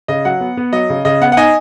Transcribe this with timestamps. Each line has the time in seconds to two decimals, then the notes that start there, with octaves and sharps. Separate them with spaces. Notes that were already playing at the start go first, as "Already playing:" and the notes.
0.08 C#3 D#5
0.25 F#3 F#5
0.41 B3
0.57 B3
0.73 F#3 D#5
0.90 C#3
1.05 C#3 D#5
1.21 B3 F#5
1.32 F#5
1.37 D#4 D#5 G#5